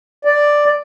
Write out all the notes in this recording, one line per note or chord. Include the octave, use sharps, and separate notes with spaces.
D5